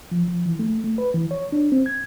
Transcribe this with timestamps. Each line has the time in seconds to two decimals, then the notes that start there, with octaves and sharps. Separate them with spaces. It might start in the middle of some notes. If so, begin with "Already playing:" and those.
0.11 F3
0.28 F3
0.46 E3
0.59 A3
0.84 A3
0.98 B4
1.14 E3
1.31 C#5
1.52 D4
1.72 C4
1.86 G#6